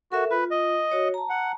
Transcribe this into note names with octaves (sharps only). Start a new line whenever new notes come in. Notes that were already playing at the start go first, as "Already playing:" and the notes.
F#4 A4 A#4 E5
F4 B4
D#5
F#4 C#5
A5 A#5
F#5